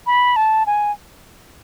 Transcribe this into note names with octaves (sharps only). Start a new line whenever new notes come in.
B5
A5
G#5